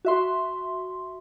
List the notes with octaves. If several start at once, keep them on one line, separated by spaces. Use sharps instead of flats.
F#4 E5 C6